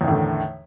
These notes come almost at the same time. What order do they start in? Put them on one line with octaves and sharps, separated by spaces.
E2 D#3 A2 D3